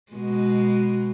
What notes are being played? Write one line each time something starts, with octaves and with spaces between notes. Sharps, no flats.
B2 G#3